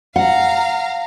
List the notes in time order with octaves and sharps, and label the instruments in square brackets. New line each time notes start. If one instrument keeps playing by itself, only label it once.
[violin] F5 A#5 [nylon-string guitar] F#5